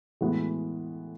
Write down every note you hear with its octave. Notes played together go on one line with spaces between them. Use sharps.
A2 E3 G#3 B3 F#4